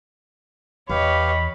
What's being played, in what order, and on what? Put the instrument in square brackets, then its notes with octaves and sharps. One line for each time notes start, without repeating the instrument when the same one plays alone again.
[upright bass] E2 [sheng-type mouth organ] G4 B4 F5 [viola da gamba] C#5 D#5 [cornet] B5